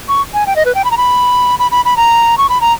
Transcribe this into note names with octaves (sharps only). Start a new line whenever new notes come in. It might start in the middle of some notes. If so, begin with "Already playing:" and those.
C#6
G#5
G5
D#5
B4
G5
B5
A#5
B5
B5
B5
B5
A#5
C#6
B5
A#5